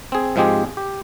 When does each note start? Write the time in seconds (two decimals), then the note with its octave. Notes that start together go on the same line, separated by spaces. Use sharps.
0.12 C4 G#4
0.36 G#2 F3 G#3 C4 G4 G#4
0.77 G4